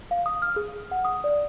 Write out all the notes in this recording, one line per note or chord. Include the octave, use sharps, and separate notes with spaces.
F5
D#6
F6
G#4
F#5
D#6
D5